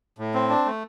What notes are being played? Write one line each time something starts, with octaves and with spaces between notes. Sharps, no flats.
A2
C4
D4
A3